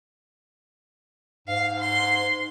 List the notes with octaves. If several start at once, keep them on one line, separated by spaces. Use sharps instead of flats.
G#2 F5
C6